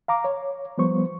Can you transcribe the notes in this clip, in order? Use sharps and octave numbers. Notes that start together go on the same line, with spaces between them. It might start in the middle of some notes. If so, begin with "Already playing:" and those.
F5 A#5 D6
C#5
F3 G3 B3 C5 C#6